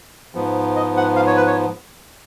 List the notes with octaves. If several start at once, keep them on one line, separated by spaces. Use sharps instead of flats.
G#2 F3 B3
D#5
F#5
F5
C#5
B4
C#5